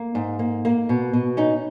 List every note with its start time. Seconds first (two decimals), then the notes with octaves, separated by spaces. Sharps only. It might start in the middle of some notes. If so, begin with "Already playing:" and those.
Already playing: A#3
0.15 G#2
0.39 A#3
0.65 A#3
0.89 B2
1.13 B2
1.37 C#4 D#4